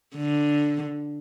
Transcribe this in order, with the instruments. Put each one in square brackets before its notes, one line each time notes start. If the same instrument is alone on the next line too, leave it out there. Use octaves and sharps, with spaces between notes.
[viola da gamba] D3